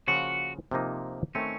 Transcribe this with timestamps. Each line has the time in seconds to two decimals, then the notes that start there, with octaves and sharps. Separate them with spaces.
0.08 C#3 F3 A#3 F4 F#4
0.71 C3 F3 A#3 D#4
1.35 D#3 A3 C4 C#4